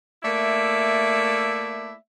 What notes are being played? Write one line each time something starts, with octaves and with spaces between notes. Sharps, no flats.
A3 A#3 E4 D5 E5